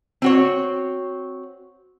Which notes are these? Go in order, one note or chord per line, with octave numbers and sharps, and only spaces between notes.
C4 F#4 C#5